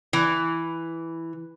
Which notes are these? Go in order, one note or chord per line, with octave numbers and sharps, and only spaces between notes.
E3